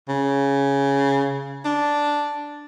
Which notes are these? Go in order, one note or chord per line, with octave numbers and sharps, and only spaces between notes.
C#3
D4